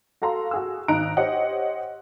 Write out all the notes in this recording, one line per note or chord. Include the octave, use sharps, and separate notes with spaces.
F#4 A4 F5 A#5 C6
F#4 G#4 E6
G#1 D#4 A#5 F#6 D7
G4 C5 C#5 D#5 F#5